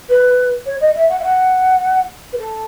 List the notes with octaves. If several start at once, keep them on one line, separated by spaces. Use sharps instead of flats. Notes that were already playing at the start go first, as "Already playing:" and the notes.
B4
C#5
D#5
E5
F#5
E5
F#5
B4
A4